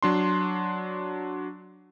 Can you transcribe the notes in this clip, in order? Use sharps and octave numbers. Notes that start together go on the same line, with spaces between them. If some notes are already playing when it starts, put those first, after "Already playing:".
F#3 D4 C6